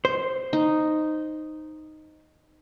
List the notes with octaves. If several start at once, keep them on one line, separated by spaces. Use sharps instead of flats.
C5
D#4